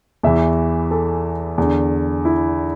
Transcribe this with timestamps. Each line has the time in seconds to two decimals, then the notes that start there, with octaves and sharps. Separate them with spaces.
0.23 E2 E3 E5
0.91 A4
1.58 E2 D3
2.25 E4